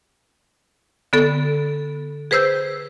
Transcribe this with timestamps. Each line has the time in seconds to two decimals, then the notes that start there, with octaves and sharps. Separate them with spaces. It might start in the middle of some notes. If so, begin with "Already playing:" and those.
1.13 D3 B3 A4
2.31 G#4 B4 C5 E6 G6